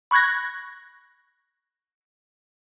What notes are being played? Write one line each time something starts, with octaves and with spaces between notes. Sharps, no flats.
B5 C#6 F#6 G#6 A#6